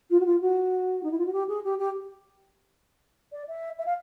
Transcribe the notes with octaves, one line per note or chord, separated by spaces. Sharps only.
F4
F#4
F4
F#4
D#4
E4
F4
F#4
G4
G#4
G4
G4
D5
E5
E5
F5